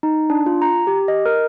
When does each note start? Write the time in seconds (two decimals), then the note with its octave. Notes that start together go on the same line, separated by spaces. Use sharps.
0.03 D#4
0.30 D4
0.46 F4
0.62 A#5
0.87 G4
1.08 D#5
1.26 A#4